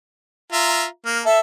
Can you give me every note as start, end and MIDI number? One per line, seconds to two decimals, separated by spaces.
0.52 0.85 65
0.52 0.85 76
0.52 0.85 82
1.06 1.22 58
1.06 1.18 89
1.25 1.40 69
1.25 1.40 76